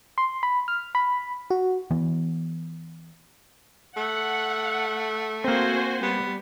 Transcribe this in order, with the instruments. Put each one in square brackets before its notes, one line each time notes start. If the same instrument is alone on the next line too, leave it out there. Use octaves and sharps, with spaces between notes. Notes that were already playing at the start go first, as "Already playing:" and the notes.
[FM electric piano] C6
B5
F6
B5
F#4
[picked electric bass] E3 B3
[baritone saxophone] A3 [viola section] F#5
[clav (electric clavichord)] A#3 C4 [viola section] F#4 C5 G#5
[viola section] G3 [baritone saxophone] B3